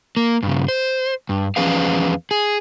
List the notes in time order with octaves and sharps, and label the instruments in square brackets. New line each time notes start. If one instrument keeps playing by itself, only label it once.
[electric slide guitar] A#3
G2 C#3
C5
G2
E2 F3 C#4 G#4 B4 F5
G#4